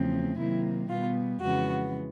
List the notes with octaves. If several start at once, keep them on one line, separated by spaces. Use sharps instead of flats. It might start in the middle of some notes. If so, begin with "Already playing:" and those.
Already playing: E2 C#3 F3 A3 C4
C3 D#3 F#3 A#3 E4
B2 G3 B3 F4
F2 C#3 E3 G#3 B3 F#4